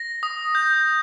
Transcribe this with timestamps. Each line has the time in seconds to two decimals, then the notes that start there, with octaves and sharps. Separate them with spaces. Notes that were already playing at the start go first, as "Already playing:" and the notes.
Already playing: A#6
0.23 D#6
0.55 G6